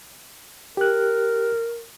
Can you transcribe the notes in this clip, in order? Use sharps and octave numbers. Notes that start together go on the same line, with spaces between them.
G4 A#4 F#6